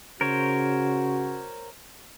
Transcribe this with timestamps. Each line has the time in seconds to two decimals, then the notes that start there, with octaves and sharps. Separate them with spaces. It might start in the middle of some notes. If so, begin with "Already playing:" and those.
0.21 C#3 F#4 A#4 C5 C#5